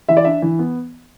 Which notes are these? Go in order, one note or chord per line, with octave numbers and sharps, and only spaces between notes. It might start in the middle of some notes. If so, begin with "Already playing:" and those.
E3 E5
D5
D4 E5
E3
B3